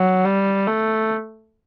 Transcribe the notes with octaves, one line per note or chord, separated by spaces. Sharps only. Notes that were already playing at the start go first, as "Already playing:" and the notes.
Already playing: F#3
G3
A3